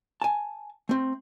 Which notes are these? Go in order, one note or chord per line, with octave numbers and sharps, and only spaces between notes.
G#5 A5
A3 C4